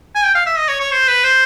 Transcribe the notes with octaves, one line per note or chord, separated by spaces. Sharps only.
G#5
G5
F5
E5
D#5
C#5
C#5
C5
B4
C5